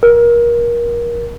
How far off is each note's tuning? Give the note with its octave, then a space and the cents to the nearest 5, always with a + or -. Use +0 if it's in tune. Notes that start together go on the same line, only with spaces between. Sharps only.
A#4 +25